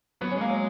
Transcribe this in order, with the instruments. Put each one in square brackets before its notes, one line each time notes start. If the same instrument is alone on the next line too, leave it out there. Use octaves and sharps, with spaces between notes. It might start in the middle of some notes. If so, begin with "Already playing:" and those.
[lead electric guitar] F#3 [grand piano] B3
[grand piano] C#4
[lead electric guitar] G#3 [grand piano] A#3
[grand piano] F#3